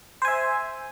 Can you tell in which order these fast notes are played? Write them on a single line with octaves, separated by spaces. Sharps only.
C5 G#5 E5